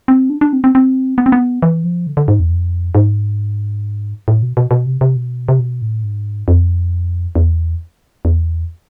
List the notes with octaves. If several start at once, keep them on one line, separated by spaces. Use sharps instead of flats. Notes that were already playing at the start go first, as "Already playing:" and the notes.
C4
D4
D4
C4
C4
C4
B3
C4
B3
E3
F3
D3
D3
G#2
E2
F2
G#2
A2
B2
B2
B2
C3
C3
B2
C3
B2
A2
G#2
F2
E2
E2